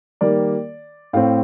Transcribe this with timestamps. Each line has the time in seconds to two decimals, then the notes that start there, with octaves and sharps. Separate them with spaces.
0.21 D#3 G3 A#3 D5
1.13 A2 A3 C4 F5